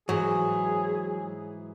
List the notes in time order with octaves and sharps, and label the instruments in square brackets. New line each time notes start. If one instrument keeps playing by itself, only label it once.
[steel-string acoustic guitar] G#2 E3 [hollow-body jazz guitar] F#3 [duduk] G#4